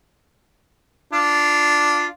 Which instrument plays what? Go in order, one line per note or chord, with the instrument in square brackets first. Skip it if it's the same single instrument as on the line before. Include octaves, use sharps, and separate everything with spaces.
[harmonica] D4 F4